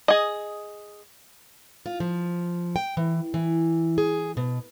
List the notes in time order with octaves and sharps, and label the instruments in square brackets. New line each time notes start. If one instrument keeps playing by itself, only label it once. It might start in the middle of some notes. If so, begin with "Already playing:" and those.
[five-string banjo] G#4 D#5
[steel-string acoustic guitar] F4
F3
G5
E3
E3
G#4
B2